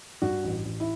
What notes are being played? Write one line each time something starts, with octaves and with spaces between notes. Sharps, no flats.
G2 F#4
A1
A1
E4